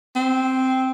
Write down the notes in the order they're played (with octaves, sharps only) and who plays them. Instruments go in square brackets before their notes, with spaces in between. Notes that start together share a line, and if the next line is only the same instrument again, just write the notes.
[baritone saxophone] C4